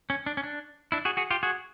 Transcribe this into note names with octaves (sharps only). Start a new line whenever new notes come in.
C#4
D4
C#4
D4
D4 E4
F#4 G#4
F#4 G#4
F4 G4
F#4 G#4